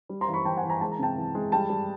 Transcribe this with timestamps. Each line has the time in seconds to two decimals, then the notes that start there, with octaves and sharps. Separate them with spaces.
0.09 G3
0.21 A#5 C6
0.28 E3
0.33 B5 C#6
0.45 E3 G5 A5
0.57 F#5 G#5
0.63 E3
0.69 G#5 A#5
0.81 G#3 A5
0.92 A#5
0.99 C3 G5 A5
1.17 E3
1.35 G#3
1.52 G3 G5 A5
1.69 G3